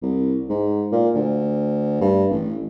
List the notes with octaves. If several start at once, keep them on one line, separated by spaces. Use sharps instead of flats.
C2
G#2
A#2
D2
G2
A1